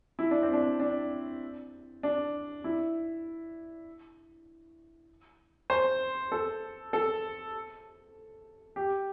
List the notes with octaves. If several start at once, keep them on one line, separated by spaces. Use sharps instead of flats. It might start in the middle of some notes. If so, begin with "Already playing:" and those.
E4
D4
C4
D4
D4
D4
E4
C5
A4
A4
G4